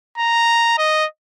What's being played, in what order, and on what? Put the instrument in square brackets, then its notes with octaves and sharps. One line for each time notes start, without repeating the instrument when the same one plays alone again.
[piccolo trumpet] A#5
D#5